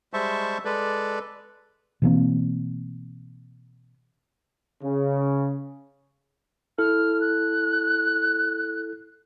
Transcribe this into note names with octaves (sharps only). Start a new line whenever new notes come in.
G3 G#3 C5 E5 A5 C#6
G#3 A4 B4 D5
B2 E3 A#3 C4
C#3
E4 A4 F6
F#6